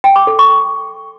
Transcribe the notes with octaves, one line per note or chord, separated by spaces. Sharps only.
G5
D6
A4
C#6